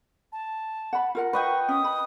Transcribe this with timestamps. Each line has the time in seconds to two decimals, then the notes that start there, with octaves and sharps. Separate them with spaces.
0.32 A5
0.93 F#5 B5
1.15 F4 A#4 F#5
1.33 B4 D#5 G5 C#6
1.69 C#4 D#6
1.84 B5